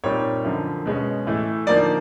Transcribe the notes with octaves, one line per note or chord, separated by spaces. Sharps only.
A#2 G3 C4 D#4 C#5
F#2 D3 F3
B2 G#3 C#4
A2 E3 A3
D3 F3 A#3 D#4 D5